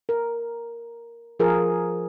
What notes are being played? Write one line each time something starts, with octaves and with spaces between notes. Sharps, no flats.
A#4
F3 F4 G#4 A#4